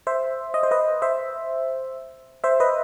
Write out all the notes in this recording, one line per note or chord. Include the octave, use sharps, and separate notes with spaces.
C5 E5
D#5
C5
B4 D#5
C5 E5
C5 E5
B4 D#5